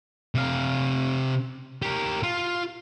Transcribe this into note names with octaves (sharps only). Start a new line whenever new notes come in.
C3 F5
G4 A#4
F4